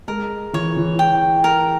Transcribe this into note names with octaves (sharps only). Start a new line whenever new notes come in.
G#3 A#4
E3 C#5
E3
G5
A#4